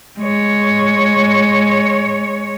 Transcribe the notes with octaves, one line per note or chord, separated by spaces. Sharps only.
G#3 C#5